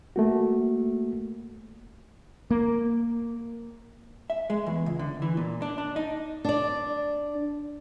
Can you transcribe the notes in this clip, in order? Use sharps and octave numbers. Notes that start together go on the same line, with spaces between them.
A3 A#3 F#4
A#3
E5
G#3
E2
C#2
D3
E3
A#2
D4
D4
D#4
D4 D5